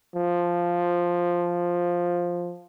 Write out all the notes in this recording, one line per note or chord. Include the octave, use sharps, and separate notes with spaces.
F3